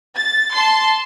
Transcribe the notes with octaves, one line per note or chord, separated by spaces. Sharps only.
A6
A5 C6